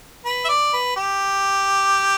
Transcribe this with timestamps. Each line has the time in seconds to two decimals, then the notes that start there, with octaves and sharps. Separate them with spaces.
0.25 B4
0.45 E5
0.49 D5
0.73 B4
0.96 G4